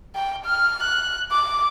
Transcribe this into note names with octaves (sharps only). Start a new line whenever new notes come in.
G5
F6
F#6
D6